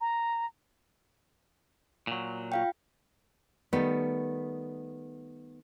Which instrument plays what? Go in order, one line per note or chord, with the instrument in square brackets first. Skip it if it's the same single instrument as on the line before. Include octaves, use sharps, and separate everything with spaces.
[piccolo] A#5
[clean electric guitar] A#2 F#3
[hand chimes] F4 F5 G5
[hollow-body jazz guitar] D#3 G3 A3 [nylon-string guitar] B3